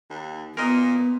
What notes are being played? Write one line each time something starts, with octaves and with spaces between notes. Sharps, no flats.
D#2
A#2 B3 A#4 D#5